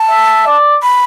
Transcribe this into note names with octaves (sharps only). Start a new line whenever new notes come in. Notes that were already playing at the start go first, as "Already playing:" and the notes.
Already playing: A5
E5
D5
B5